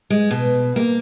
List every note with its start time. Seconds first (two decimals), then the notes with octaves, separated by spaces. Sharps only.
0.10 G#3
0.31 B2
0.76 A#3